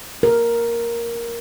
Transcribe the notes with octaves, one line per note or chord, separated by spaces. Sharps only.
A#4